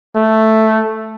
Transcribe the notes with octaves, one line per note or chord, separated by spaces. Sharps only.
A3